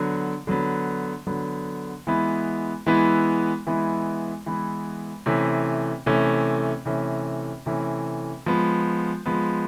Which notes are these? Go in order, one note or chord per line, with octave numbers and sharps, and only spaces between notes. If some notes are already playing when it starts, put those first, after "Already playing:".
Already playing: D3 F#3 B3
D3 F#3 B3
D3 F#3 B3
E3 G#3 B3 E4
E3 G#3 B3 E4
E3 G#3 B3 E4
E3 G#3 B3 E4
C3 E3 A3 C#4
C3 E3 A3 C#4
C3 E3 A3 C#4
C3 E3 A3 C#4
F3 G#3 B3
F3 G#3 B3